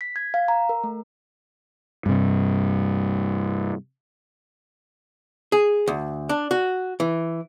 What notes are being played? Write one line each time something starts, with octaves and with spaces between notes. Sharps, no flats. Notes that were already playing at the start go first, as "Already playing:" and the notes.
B6
G#6
F5
A#5
A#4
A3
G2 C3
G#4
D2
D4
F#4
E3